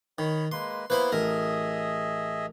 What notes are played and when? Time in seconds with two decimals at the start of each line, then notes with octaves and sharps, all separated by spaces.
0.18 D#3 C#5 B5
0.52 G#3 A#3 B4 C6
0.90 A#3 B3 E4 B4 C5 B5
1.12 A1 G#4 A#4 D#5 E5